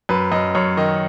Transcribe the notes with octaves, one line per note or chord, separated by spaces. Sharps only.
F#2 B4
F#2 D#5
F#2 C#5
D#3 D#5